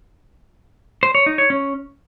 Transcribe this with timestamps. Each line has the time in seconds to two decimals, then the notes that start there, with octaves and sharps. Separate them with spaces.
1.03 C5
1.15 C#5
1.26 D#4
1.38 C#5
1.50 C#4